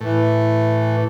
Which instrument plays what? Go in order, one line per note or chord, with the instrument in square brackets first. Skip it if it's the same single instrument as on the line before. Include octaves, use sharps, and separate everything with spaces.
[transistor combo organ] A2 [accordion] E3